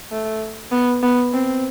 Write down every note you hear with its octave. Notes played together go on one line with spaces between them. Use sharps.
A3
B3
B3
C4